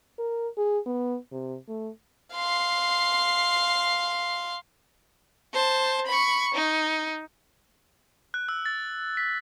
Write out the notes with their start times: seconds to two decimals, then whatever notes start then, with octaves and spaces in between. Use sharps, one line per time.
0.18 A#4
0.57 G#4
0.86 B3
1.32 C3
1.68 A3
2.34 F5 C6
5.54 C5 A5
6.07 B5 C#6
6.54 D#4
8.34 F#6
8.49 E6
8.66 A6
9.17 B6